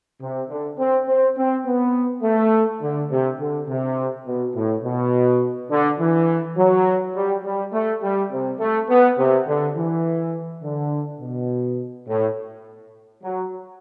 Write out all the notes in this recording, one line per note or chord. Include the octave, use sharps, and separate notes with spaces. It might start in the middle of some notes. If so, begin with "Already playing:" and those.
C3
D3
C4
C4
C4
B3
A3
D3
C3
D3
C3
B2
A2
B2
D3
E3
F#3
G3
G3
A3
G3
C3
A3
B3
C3
D3
E3
D3
B2
A2
F#3